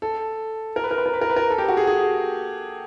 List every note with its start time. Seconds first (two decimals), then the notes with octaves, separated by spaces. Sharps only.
0.02 A4
0.76 A#4
0.84 B4
0.91 A#4
0.98 B4
1.06 A#4
1.14 B4
1.21 A#4
1.30 B4
1.36 A#4
1.50 A4
1.58 G4
1.68 F#4
1.77 G#4
1.87 G#4